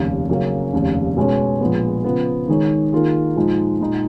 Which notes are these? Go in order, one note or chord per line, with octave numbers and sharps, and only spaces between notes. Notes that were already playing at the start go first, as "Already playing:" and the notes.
Already playing: F1 D#2 C#3
C#3 F#3 A#3 C#4 G#4
F1 D#2 C#3
B2 G#3 C#4 G#4 C#5
A#1 A#2 G#3 B3
C#3 F3 B3
D#3 G#3 D#4 G#4 C#5
D#3 A#3 F4 G#4
A#2 F3 G#3 D#4
A#2 G#3 D#4